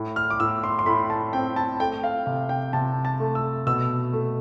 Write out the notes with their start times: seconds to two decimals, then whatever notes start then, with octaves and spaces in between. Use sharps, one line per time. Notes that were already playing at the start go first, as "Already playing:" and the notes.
Already playing: A2
0.16 F6
0.30 D6
0.40 A2 E6
0.64 C6
0.79 C6
0.86 A2 B5
1.10 A5
1.33 C4 G5
1.56 A5
1.80 A3 G5
2.03 F5
2.26 C3 F5
2.49 G5
2.73 C3 A5
3.05 A5
3.20 A3
3.35 E6
3.67 B2 E6
4.13 A3